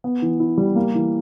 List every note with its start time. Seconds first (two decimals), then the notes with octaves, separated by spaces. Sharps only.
0.04 B3
0.22 E3
0.40 E4
0.58 G3
0.76 A#3
0.95 E3